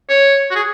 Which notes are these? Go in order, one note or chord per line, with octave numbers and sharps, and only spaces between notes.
C#5
F#4
G#4